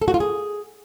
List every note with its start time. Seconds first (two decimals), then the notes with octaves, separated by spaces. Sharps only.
0.02 A4
0.08 F#4
0.14 F4
0.20 G#4